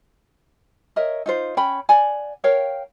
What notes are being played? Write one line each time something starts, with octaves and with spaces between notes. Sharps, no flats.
A#4 C#5 D#5 E5
D#4 F4 C5
C#4 G5 B5
D5 F#5 G#5
A#4 C#5 F5 G5